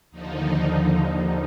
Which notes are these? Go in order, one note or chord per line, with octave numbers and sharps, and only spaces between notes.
D#2 D3 F3 D#4